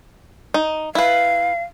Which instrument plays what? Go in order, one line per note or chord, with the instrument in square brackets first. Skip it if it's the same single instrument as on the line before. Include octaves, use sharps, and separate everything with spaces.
[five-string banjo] D#4
[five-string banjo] E4 B4 [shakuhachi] F5